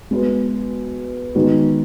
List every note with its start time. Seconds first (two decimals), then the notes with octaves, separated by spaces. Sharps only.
0.11 G#3 B3 F#4 B4
1.35 D#3 G#3 B3 D#4 F#4